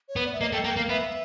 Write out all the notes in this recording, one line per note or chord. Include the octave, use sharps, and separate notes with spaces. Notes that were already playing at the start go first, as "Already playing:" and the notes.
C#5
B3
D5
E5
A#3 D#5
A3 G5
A#3 G5
A#3 F5
B3 E5